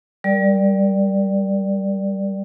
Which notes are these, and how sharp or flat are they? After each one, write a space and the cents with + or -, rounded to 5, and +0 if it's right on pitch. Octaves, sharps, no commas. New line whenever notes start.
G3 -5 A#4 +0 D5 +0